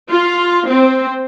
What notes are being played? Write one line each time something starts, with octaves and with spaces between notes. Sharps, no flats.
F4
C4